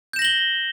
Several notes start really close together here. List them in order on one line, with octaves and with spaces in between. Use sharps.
G6 E7 A#6 F#7 G7